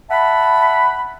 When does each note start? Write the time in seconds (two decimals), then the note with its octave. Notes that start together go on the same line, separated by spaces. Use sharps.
0.11 E5 F#5 A5 B5